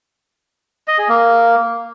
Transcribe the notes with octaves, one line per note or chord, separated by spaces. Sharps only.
D#5
G#4
A#3